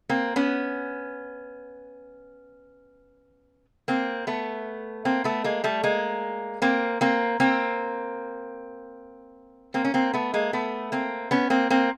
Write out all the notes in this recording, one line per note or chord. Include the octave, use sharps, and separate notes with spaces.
A#3 C4
B3 C#4
A#3 C4
A3 B3
A#3 C4
A3 B3
G#3 A#3
G3 A3
G#3 A#3
A#3 C4
A#3 C4
A#3 C4
A#3 C4
C#4
A#3 C4
A3 B3
G#3 A#3
A3 B3
A#3 C4
B3 C#4
A#3 C4
A#3 C4